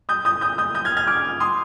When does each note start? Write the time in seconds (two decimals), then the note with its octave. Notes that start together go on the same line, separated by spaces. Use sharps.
0.09 D#6 G6
0.25 D#6 G6
0.41 D#6 G6
0.58 D#6 G6
0.75 D#6 G6
0.85 F6 G#6
0.97 F6 G#6
1.07 D6 F6
1.40 C6 D#6